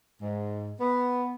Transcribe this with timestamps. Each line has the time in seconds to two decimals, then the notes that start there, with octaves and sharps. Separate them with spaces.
0.22 G#2
0.81 B3